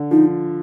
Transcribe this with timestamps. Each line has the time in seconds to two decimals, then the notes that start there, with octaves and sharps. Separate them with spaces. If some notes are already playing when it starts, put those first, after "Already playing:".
Already playing: D3
0.11 F3 D#4